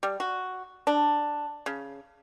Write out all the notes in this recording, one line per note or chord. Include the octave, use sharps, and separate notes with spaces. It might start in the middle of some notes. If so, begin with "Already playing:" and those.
G3
F#4
D4
C#3